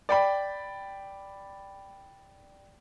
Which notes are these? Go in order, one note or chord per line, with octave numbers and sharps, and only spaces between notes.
D5 G5 B5